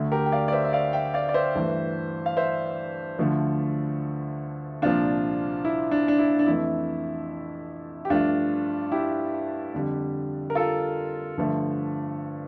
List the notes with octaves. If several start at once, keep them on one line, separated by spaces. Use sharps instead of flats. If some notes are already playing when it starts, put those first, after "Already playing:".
Already playing: D2 D3 A3
G4 A#4
G5
D5 F5
D5
C5 E5
E5
D5 F5
E5 G5
D5 F5
D5
C5 E5
G2 E3 A3
F5
C5 E5
D2 D3 F3 A3
C2 A#2 F3 D4 F4
E4
D4
D4
E4
D4
F2 E3 A3 E4
G4
G2 F3 A3 D4 F4
E4 G4
F2 D3 G3
A#4
F4 A4
G2 D3 F3 A3